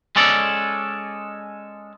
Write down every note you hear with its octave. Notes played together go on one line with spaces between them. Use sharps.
G#3 C#4 A4 D5